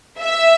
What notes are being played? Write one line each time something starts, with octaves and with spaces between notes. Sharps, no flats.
E5